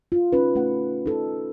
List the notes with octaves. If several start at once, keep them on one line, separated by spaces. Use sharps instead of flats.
F4
C#4 D#4 F4 B4
A3 C#4 F#5
D#4 A4